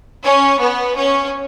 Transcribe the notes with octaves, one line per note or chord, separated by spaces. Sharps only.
C#4
B3
C#4